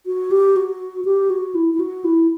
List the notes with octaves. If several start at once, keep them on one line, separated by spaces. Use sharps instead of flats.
F#4
G4
F#4
G4
F#4
E4
E4
F#4
E4